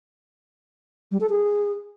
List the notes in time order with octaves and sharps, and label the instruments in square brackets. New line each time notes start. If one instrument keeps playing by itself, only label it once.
[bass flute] G3
A4
G#4